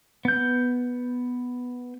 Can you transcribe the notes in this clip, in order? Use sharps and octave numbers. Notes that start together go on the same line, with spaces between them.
B3 G6